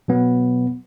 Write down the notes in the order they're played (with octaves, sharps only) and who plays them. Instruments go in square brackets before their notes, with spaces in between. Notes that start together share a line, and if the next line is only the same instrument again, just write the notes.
[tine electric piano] B2 F#3 B3